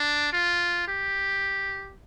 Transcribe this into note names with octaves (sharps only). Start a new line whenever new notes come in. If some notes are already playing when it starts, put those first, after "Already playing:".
Already playing: D4
F4
G4